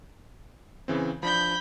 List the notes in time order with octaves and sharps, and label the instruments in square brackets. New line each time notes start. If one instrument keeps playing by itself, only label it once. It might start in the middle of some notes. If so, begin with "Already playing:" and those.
[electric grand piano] C#3 E3 C4
[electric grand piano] F3 D4 [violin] B5 G6